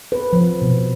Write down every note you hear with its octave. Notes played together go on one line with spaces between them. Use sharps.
B4
F3
B2